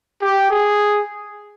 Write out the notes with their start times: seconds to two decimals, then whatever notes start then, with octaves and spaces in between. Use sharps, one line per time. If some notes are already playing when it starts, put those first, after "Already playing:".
0.22 G4
0.50 G#4